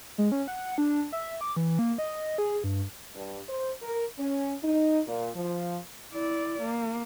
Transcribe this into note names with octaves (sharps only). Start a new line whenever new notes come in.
G#3
C#4
F#5
D4
E5
D6
E3
A#3
D#5
G#4
G2
G2
C5
A#4
C#4
D#4
A#2
F3
E4 D5
A#3